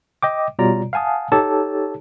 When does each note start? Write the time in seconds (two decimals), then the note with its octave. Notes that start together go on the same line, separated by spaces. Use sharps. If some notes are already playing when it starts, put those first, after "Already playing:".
0.22 D#5 G5 D6
0.59 B2 G3 F4 C#5 D5 A#5
0.93 F5 F#5 G#5 A5 D#6
1.32 D#4 G4 A4 C#5 A5